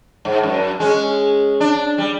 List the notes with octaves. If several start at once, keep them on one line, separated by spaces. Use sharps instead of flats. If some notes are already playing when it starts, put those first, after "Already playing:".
G#2
F#2
G#3 C#4
D4
G3